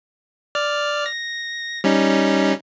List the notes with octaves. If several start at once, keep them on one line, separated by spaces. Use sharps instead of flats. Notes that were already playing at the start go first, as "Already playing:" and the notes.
D5 F6
A#6
G3 C#4 D#4